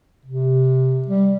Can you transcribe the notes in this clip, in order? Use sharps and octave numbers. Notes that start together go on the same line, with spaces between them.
C3
G3